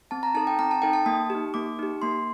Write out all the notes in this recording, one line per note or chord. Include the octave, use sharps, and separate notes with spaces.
C4 A5
A#5
D#4 A4 A5
G5
C4 A#5
A5
D#4 A4 G5
A5
A#3 D#6
D#4 G4
A#3 D6
D#4 G4
A#3 C6